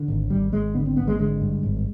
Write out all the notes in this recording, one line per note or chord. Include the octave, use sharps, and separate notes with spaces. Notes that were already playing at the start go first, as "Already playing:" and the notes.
Already playing: D3
G#1
G#1 G3
G#1 G#3
D3 B3
C4
G#1 B3
G#3
D3 G#3
G2
G#1